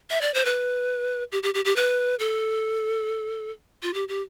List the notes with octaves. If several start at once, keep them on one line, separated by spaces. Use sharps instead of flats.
E5
D5
C5
B4
G4
G4
G4
G4
B4
A4
F4
G4
G4